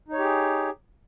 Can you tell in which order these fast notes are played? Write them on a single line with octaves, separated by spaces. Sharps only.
D#4 C#5 G4 G#4